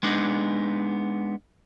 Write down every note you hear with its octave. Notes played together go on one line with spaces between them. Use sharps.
G#3 B3 D4 D#4